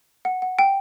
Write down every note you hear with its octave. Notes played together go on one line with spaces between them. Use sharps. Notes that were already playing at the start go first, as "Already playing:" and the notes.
F#5
F#5
G5